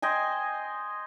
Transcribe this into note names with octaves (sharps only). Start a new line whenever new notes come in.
C5 D#5 G5 G#5